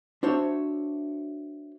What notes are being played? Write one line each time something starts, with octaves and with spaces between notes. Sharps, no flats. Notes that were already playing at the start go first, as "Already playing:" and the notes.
D4 F#4 C5 C#5 E5